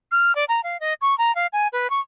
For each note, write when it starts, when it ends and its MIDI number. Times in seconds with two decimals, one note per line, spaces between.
0.12 0.35 89
0.35 0.45 74
0.48 0.61 82
0.64 0.80 77
0.80 0.94 75
1.01 1.17 85
1.18 1.34 82
1.35 1.47 77
1.53 1.68 80
1.73 1.90 71
1.90 2.00 85